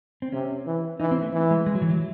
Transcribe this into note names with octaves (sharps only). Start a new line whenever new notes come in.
C4
C3 C#4
E3
E3 D#4
C4
A3
E3
G#3
G#3
F#3
E3
F#3